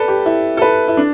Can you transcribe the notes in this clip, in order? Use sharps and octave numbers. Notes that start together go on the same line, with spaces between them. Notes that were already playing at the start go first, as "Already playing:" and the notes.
Already playing: A4 B4 D5
G4
E4
A4
B4
E4
D4